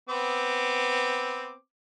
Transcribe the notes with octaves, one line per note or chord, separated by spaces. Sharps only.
B3 C4 D6